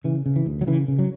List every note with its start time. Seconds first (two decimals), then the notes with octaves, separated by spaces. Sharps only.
0.04 C#3 E3
0.26 C#3
0.36 E3
0.46 D2
0.61 F#3
0.67 C#3 E3
0.88 C#3
0.99 F#3